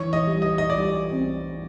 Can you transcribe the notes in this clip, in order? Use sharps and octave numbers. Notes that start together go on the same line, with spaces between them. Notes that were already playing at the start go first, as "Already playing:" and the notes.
Already playing: E3 C#5
D#5
G3
D#5
D#5
G3 D5
C4